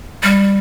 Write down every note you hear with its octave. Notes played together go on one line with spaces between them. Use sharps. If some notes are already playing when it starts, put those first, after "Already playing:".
G3